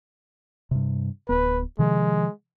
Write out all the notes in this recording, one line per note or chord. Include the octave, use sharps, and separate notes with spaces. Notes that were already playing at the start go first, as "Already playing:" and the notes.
G2 C3
D1 B3 B4
C3 D#3 F3 G#3